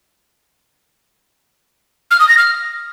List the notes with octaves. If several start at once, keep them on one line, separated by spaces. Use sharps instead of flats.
F6
D#6
A#6
F6